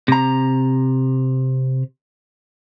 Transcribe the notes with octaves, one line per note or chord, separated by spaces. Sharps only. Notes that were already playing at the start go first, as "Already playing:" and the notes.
C3 A#5